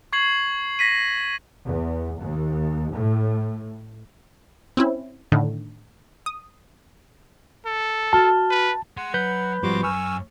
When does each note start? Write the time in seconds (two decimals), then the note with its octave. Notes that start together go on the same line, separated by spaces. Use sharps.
0.13 C#6 G#6 C7 F#7
0.79 A#6 B6 D#7
1.64 E2
2.20 D#2
2.93 A2
4.77 C4 C#4 E4
5.32 A2 D3 D#3
6.26 D#6
7.66 A4
8.13 F#4 A5 F6 G7
8.51 B4
8.97 G#4 F#5 C6
9.14 F#3 B4 B5 G6
9.63 G#2 F3 G3 C4 F#4 C6 D6
9.83 F#2 G#5 C#6 E6 F6